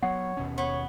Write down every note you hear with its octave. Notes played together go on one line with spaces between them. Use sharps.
F#3 B3 C#5 F#5
D#2 B2 C#4
B3 C#5